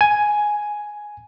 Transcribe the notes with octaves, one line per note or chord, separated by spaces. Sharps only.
G#5